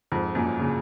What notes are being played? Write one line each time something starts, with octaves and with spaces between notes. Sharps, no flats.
F2 G#2
F#2 A#2
A#2 C#3